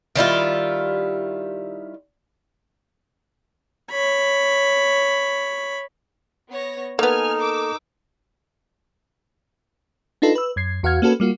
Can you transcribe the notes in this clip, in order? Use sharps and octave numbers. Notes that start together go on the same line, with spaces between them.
D#3 G3 E4 F4
C#5 B5
B3 C#5 A#6
A#3 B3 D#4 A4 G#5 F6
A#4 D6 E6
D4 D#4 F4 A4 B4
B4 E6
F#2 G#6 C7
E2 F#4 F5 F#5 F6 G#6
A#3 C#4 F#4 A4 B4
G3 A#3 F4 F#4